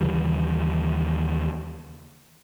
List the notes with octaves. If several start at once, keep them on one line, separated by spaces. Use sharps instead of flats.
D#2 C#3 E3 G3